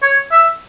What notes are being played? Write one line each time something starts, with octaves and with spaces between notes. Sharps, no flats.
C#5
E5